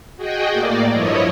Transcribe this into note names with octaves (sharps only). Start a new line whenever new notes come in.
F#4 G#4 D#5 G5
A2 A#3 D5
G2 F3 E4 C#5 D#5